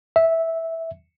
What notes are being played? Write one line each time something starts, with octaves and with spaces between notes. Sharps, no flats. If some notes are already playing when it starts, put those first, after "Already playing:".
E5